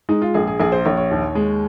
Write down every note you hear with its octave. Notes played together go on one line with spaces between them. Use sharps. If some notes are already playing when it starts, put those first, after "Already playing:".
G#3 D#4
F4
A#1 G#4
G#4
A#1 G#4
C5
A#1 C#5
C#5
D#2
G#3